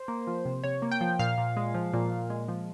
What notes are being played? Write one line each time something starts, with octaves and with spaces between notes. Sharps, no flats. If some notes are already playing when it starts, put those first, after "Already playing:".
Already playing: C5
A#3
F3
C3
C3 C#5
A#3
G5
F3
A#2 F5
A#2
G#3
F3
A#2
A#2
G#3
F3